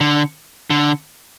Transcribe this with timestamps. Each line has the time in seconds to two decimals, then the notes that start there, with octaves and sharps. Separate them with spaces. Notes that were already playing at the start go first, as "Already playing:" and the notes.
0.01 D3
0.70 D3